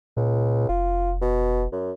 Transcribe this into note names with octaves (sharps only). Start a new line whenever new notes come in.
C#2 A#2
F1 F4
B2
F#2